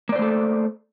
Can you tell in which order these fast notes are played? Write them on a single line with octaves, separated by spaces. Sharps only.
A#3 D5 C5 A3 A4